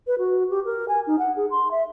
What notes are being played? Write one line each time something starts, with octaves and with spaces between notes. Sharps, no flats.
B4
F#4
G4
A#4
G#5
D#4
F#5
G#4
C6
E5